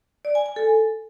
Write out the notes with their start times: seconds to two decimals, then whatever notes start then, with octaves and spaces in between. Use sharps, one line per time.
0.25 D5
0.35 G#5
0.46 G#5
0.56 A4